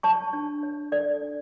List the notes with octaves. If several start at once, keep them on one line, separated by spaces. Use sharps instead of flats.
C#5 A5 C#6
D4
C#5
A4 D5
D4